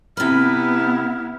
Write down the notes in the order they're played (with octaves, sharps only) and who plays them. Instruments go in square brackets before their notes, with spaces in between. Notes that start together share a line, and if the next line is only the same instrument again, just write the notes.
[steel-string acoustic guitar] C3 B4 [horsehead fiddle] B3 E4 [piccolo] F6